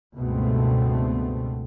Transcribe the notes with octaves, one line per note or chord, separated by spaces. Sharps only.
C#2 G2 B2 A3 B3 C4